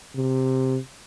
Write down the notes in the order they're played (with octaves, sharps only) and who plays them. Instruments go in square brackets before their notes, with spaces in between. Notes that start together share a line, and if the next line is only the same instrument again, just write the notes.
[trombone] C3